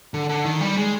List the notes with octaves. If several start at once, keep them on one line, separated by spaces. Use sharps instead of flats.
D3
D3
D#3
G3
G#3